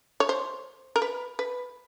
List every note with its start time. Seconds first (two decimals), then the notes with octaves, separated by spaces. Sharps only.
0.20 C#5
0.29 C5
0.96 A#4
1.02 B4
1.39 B4